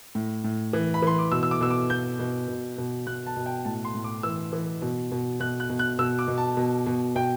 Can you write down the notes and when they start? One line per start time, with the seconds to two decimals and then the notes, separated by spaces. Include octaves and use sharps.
0.15 A2
0.44 A2
0.73 E3
0.94 B5
1.02 E3 C6
1.19 D6
1.32 B2 E6
1.43 E6
1.51 D6
1.61 B2 E6
1.71 D6
1.90 B2 G6
2.19 B2
2.48 B2
2.78 B2
3.07 B2 F#6
3.27 A5
3.37 B2
3.46 G5
3.65 A2 A5
3.85 C6
3.95 A2
4.04 D6
4.23 E3 E6
4.53 E3
4.82 B2
5.12 B2
5.40 B2 F#6
5.60 F#6
5.70 B2
5.79 F#6
5.99 B2 E6
6.19 D6
6.28 B2
6.38 A5
6.57 B2
6.87 B2
7.16 B2 G5